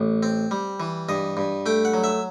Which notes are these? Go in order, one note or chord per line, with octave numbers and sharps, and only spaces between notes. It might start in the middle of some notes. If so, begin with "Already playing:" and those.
Already playing: A1
C4
G3
E3
G2 D#5
G2
A3 G5
F#5
F#3
E5